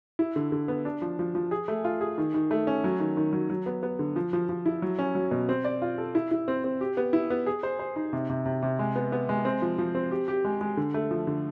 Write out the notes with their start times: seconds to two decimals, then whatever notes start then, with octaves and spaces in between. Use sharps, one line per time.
0.19 E4
0.36 D3
0.52 D3
0.68 B3
0.85 D4
1.02 F3
1.19 F3
1.35 F3
1.51 G#4
1.68 A3
1.84 F4
2.01 G#4
2.18 D#3
2.34 D#3
2.51 A3
2.67 C#4
2.84 F#3
3.00 D#3
3.17 D#3
3.33 F#3
3.50 F#3
3.66 B3
3.83 B3
3.99 D3
4.16 F3
4.33 F3
4.49 F3
4.66 E4
4.82 F#3
4.99 C#4
5.15 F#3
5.31 B2
5.49 C4
5.64 D5
5.82 F4
5.98 A4
6.15 E4
6.31 E4
6.48 C4
6.64 C4
6.81 G4
6.97 B3
7.13 E4
7.30 B3
7.46 G#4
7.63 C5
7.79 C5
7.96 D#4
8.13 C3
8.29 C3
8.46 C3
8.63 C3
8.79 G#3
8.96 B3
9.12 B3
9.29 G#3
9.45 C4
9.62 F3
9.78 F3
9.95 C4
10.11 G4
10.28 G4
10.45 G#3
10.61 G#3
10.77 D3
10.94 A3
11.11 F3
11.27 D3